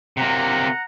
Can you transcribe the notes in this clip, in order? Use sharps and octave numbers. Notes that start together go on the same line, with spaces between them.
C3 A#3 F#5 A#5